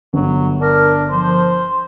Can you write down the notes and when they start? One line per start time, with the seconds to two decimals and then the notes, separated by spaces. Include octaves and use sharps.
0.14 G1 F#3
0.61 D4 A#4
1.11 F3 C5